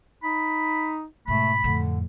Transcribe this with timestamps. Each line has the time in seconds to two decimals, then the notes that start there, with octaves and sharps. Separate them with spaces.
0.23 D#4 B5
1.28 G#2 B2 A3 B5
1.64 F2 A2 D3